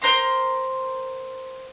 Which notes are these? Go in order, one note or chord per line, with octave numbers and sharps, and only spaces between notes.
A#4 C5 A#5 C6